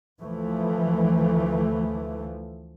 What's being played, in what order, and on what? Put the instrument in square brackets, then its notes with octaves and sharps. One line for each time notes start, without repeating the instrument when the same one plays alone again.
[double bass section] D2 E3 F3 A3